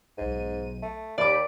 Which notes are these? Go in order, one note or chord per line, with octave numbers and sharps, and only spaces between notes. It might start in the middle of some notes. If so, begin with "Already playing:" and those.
B1 G#2 D#7
A3
D#2 G4 D5 B5 D6